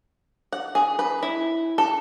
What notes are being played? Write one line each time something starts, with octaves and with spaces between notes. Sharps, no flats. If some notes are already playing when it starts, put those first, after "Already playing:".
F#5
G#4
B4
E4
A4